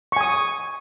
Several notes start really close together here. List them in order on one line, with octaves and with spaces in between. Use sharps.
C#6 G#5 D#6